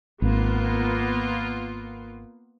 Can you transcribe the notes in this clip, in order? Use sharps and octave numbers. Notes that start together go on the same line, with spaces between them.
G#1 A#3 B3 F4